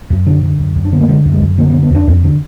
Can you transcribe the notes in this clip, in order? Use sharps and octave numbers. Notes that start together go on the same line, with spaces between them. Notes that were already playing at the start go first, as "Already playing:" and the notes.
F#2
D3
D3
F#2
F#2
D4
D3 B3
A#3
D3 G#3
F#2
G#3
F#2
D3 A#3
B3
D3
B3
F2 D4
F2
D3